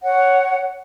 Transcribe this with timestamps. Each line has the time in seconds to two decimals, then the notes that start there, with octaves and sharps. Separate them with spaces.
0.04 C#5 F#5